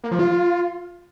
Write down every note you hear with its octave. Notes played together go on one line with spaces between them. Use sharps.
A#3
F3
F4